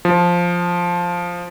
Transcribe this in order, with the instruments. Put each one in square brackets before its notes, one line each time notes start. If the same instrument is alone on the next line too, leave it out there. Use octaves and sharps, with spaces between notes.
[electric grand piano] F3